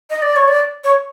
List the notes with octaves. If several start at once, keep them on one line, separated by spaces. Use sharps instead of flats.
D#5
D5
C#5
D5
C#5